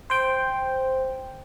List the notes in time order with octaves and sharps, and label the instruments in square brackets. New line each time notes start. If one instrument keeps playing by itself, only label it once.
[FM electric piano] C5 G5